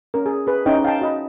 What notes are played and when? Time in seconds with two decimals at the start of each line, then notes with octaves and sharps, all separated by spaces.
0.14 C#4 A#4
0.26 G#4
0.47 G#4 B4
0.66 C#4 D#4 E4 C5 D#5 G5
0.84 F5 G5 A5
1.01 F#4 D#5 B5